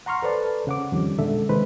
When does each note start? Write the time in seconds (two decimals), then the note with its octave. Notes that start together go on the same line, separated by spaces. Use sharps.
0.06 F#5 A#5 C6 C#6 F6
0.22 A4 B4 C5 D5 A5
0.67 C#3 F#5 D6
0.92 F2 D3 D#3 G3 C#4
1.19 B2 D3 G#3 A4 E5
1.49 C3 D#3 G#3 B4 C5